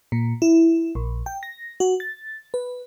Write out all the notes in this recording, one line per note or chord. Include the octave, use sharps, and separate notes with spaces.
A#2
E4
A#1
G5
A#6
F#4
A6
B4